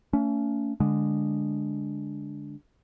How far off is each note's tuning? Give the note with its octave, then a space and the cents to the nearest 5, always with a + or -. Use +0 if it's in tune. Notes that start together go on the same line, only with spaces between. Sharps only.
A3 +35 C#4 +35
D3 -10 G#3 -10